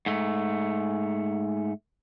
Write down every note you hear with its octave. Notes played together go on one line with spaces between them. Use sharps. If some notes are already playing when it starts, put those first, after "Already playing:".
G#2 A3